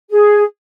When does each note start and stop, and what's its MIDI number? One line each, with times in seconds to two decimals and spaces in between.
0.10 0.42 68